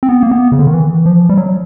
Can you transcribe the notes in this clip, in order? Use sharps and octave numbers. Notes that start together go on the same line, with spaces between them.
C4
B3
A#3
B3
C#3
D3
D#3
E3
F3
G3
F#3